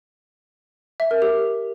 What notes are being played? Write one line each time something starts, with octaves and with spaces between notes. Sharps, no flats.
E5
A#4
G4